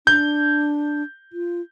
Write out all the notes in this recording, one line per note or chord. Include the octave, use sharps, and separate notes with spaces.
D4 G6
F4